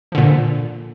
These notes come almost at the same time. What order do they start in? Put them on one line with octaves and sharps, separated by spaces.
F3 D3 A#2